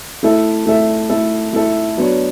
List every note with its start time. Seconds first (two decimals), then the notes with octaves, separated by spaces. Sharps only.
0.23 A3 E4 A4 E5
0.66 A3 E4 A4 E5
1.10 A3 E4 A4 E5
1.53 A3 E4 A4 E5
1.97 F#3 B3 D4 F#4 C#5